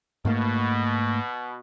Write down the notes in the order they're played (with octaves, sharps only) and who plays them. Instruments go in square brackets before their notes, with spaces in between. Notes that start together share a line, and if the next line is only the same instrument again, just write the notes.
[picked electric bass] G#2 A3 A#3 [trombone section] B2